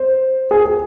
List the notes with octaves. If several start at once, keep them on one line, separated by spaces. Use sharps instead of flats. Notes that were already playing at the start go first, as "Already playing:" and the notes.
Already playing: C5
G#4
G#4